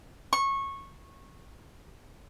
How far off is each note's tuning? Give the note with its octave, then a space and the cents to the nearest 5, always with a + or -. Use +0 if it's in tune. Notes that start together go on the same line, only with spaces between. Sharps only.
C#6 -20